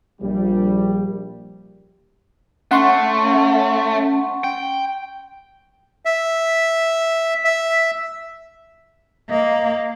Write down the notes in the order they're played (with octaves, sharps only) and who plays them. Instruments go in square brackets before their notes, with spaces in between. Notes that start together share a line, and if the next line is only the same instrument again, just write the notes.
[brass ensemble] A#1 G3
[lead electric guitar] A3 [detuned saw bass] C#4 [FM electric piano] F#5 C6 C#6
[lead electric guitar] G5
[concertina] E5
E5
[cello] A#3 [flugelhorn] D#5